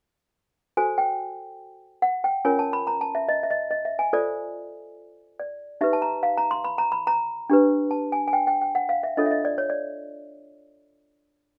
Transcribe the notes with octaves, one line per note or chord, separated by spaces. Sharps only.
F#4 A4 C5 G#5
G5
F#5
G5
C#4 F4 A#4 C#5 G#5
A5
B5
A#5
A5
E5
D#5
E5
D#5
D#5
E5
G#5
F4 A4 C5 D5
D5
D#4 G4 B4 E5
A5
A#5
F5
A#5
C6
B5
A#5
B5
A#5
D4 G4 B4
A5
G#5
G#5
G5
G5
G5
F#5
F5
E5
D4 F4 A4 C#5 D#5
E5
D#5
D5
C#5
D5